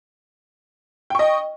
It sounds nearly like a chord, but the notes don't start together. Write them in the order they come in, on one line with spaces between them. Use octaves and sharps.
G5 C#6 D#5